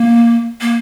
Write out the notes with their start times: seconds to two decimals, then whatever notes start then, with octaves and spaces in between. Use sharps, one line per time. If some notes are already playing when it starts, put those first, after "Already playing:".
Already playing: A#3
0.61 A#3